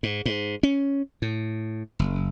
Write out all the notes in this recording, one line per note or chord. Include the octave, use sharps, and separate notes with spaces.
G#2
G#2
C#4
A2
F#1